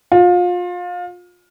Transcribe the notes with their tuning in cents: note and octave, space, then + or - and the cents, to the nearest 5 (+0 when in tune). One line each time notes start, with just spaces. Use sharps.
F4 +30